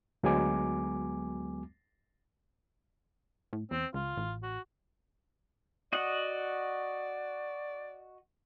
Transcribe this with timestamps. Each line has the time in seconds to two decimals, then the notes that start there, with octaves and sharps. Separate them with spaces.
0.23 D2 F#3 G#3 B3 G#5 D6
3.53 A2
3.71 E2 C4
3.94 C#2 F4
4.17 A1
4.43 F#4
5.93 F#4 D5 D#5 F#5